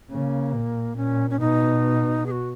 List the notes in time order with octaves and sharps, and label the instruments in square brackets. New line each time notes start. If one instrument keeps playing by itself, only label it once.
[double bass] C#3 [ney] A#3
[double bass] A#2
[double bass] A#2 [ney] C#4
[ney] C#4
[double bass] B2 [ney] D#4
[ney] G#4
F#4